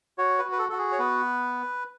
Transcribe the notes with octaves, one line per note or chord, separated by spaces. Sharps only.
F#4 C#5
B4
F#4
B4
A4
F#4 A4
G#4
C#5
B3 B4